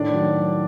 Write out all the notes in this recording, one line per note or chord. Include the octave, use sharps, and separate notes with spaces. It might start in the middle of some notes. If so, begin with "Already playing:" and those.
Already playing: A2 D#3 D4 D5
F#3